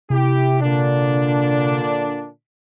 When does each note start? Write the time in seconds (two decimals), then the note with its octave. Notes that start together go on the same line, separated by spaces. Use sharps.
0.10 C3 E4 G4
0.61 A#2 D3 D4